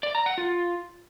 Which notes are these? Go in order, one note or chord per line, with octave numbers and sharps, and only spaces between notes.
D5
A#5
F#5
F4